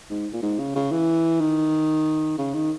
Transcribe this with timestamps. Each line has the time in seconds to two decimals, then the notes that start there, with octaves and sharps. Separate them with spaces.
0.10 G#2
0.33 A#2
0.42 G#2
0.59 C#3
0.75 C#3
0.91 E3
1.41 D#3
2.38 C#3
2.54 D#3